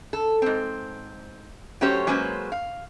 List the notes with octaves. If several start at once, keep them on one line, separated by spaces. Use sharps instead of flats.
A4
G#2 C4
F#3 A3 C#4 G4 C5 C#5
F#3 G#3 A#3 C#4 B4 C5
F5